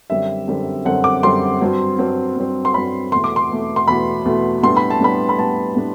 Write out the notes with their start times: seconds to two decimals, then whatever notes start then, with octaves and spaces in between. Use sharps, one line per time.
0.10 F#2 D3 G3 C4 E5
0.48 F#2 D3 G3 C4
0.85 F#2 D3 G3 C4 F#5
1.04 D6
1.23 F#2 D3 G3 C4 C6
1.61 G2 F#3 C4
1.98 G2 F#3 C4
2.37 G2 F#3 C4
2.65 C6
2.74 G2 F#3 C4 B5
3.12 E2 B2 A3 C6
3.24 D6
3.36 C6
3.50 E2 B2 A3
3.76 C6
3.88 E2 B2 A3 B5
4.25 E2 B2 A3
4.63 A2 G3 B3 D4 C6
4.77 B5
4.90 A5
5.00 A2 G3 B3 D4 B5
5.29 B5
5.38 A2 G3 B3 D4 A5
5.76 A2 G3 B3 D4